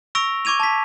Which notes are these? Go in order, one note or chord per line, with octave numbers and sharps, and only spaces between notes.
C#6 E6 A#6 D7 F7
C#6 D6 G#6 D#7 F7
A5 B6